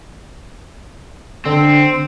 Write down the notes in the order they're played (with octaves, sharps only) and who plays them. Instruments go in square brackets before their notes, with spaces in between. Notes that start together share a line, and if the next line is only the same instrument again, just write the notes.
[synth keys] D3 [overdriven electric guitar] C4